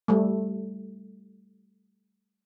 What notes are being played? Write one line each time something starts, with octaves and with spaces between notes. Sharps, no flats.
G3 A3